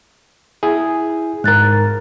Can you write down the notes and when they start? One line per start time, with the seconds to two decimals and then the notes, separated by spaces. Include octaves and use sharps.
0.63 E4 G#4
1.44 G#2 A#4 F#6 A6